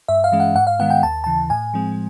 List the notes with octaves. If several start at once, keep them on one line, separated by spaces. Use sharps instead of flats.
G2 E5
F5
E3 G#3 C#4
F#5
G#2 F#5
F5
D#3 G#3 B3 F#5
G5
D#2 A5
C#3 E3 A5
A2 G#5
F3 G#3 C4